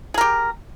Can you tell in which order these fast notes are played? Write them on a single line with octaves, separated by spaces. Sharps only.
G#4 A#4 G4